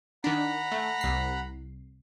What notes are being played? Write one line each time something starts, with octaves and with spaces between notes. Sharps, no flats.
D#3 D4 F#5 A#5 B5
A3
C2 C7